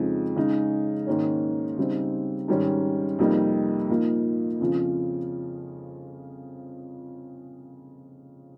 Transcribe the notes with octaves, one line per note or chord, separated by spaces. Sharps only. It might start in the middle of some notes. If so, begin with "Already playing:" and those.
Already playing: F2 C#3 F3 G#3 D#4
C#3 G#3 D#4
G#2 D#3 A#3 C#4
C#3 G3 C4 D#4
G#2 D#3 G3 C#4
F2 C3 G3 A#3 D#4
A#2 F3 A#3 D#4
F2 C#3 F3